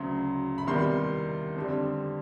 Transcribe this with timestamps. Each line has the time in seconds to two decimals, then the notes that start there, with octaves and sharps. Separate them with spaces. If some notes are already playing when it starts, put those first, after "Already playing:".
Already playing: D2 C#3 F#3 C6
0.58 B5
0.67 E2 C3 D#3 G3 C6
1.56 F2 D3 G3